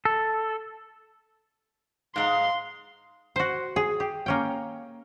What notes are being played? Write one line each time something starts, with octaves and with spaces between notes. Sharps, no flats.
A4
G#2 G#3 F5 A#5 C6
F#4 C5
G#4
G4
A#3 C#4 G5